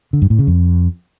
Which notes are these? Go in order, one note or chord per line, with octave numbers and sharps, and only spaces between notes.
D3
G2
A2
C#3
F2